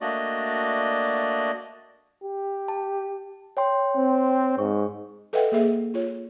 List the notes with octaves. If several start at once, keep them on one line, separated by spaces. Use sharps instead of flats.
A3 A#3 D4 F#4 D5 D#5
G4
A5
C#5 G5 C6
C4
G#2 C#6
A4 B4 D#5 E5 F#5 G5
A#3 G#4 E5
F4 C#5